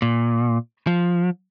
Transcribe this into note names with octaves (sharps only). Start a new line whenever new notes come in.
A#2
F3